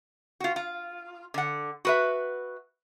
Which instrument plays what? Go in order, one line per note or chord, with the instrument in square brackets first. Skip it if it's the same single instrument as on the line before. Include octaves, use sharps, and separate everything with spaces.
[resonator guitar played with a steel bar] F4 F#4
F4
D3 F#5
F#4 B4 E5